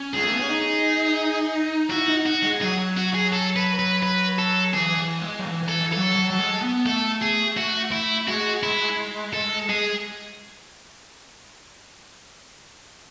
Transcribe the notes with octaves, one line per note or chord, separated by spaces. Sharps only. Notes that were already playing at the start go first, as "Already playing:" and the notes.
Already playing: C#4
G#3 G#4
A3
B3
C#4
D#4
E4 F#4
D#4
F#4
G#3
F#3 G#4
F#4
G#4
A4
B4
B4
B4
A4
E3 G#4
E3
G#3
F#3
E3
E3
A4
E3
F#3 A4
F#3
F#3
G#3
B3
A3 A4
G#4
F#4
E4
G#3 F#4
E4
A4
G#3 G#4